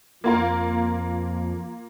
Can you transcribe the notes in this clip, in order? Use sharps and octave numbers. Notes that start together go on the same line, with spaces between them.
F2 F3 A#3 F4 A#4